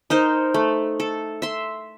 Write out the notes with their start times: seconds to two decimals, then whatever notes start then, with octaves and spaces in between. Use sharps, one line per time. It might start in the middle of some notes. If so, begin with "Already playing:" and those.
0.10 D#4 A#4 C5
0.54 A3
1.00 A4
1.42 E5 C6